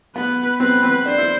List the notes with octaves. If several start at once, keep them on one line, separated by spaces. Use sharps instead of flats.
B3 B4
C4 B4
C4
D4 C5
E4